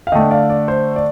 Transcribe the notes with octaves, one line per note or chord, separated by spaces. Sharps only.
F5
D3 A3 D4 D#5 G5
D5 F5
D5
C5
D5